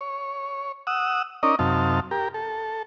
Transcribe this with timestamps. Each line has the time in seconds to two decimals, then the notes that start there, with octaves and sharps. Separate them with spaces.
0.01 C#5
0.87 F#5 D#6 E6
1.43 C#4 D#4 A#4 D5 D#5
1.59 F#2 C3 D#4 F5 A5
2.11 G4 A#4
2.34 A4